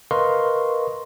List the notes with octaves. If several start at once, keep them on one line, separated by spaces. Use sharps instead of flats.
A#4 B4 D#5 F5 C6 C#6